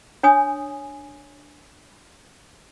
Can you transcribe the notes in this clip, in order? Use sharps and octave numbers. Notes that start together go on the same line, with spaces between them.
D4 C#5 G#5 D#6